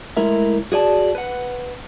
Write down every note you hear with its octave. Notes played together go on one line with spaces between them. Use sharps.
G#3 A3 E4 A#4 E5
F#4 G#4 D5 A5
B4 F#5